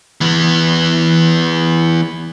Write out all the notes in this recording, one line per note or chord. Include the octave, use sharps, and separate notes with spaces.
E3 B3